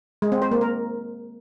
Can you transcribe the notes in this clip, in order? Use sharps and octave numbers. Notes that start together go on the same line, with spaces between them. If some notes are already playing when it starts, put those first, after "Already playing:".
G#3
C4
C5
A#3
A#4